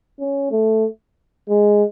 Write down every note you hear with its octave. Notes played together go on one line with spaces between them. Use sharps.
C#4
A3
G#3